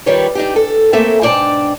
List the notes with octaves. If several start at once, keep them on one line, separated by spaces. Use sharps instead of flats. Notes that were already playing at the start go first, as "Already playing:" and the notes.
D#3 F3 G3 G4 B4 C#5
D4 D#4 G4
A4
A3 A#3 C4 A4 E5
G#2 B2 D4 D5 G5 A5